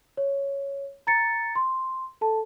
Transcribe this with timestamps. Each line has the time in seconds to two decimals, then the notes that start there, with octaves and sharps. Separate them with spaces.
0.17 C#5
1.07 A#5 A6 C#7
1.55 C6
2.21 A4 A5